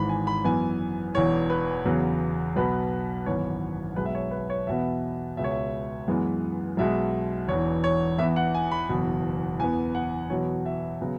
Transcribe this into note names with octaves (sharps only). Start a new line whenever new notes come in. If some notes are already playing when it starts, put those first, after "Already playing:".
Already playing: G#1 G#2 E3 B5
G#5
B5
F#2 E3 B3 G#5
E1 E2 E3 C#5
B4
E2 C#3 F#3 B3
B1 B2 B3 B4
G#1 F#2 E3 B3 C#5
B1 B2 G#3 B4
E5
C#5
B4
C#5
E2 B2 B3 E5
C#2 B2 G#3 E5
C#5
E5
F#2 E3 G#3 B3
B1 B2 G#3 E5
E1 E2 E3 C#5
C#5
E2 E3 B3 E5
F#5
G#5
B5
F#1 E2 B2
E2 E3 B3 G#5
F#5
E2 B2 F#3 B3 C#5
E5
C#3 F#3 B3